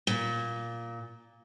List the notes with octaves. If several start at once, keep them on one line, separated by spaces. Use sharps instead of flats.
A#2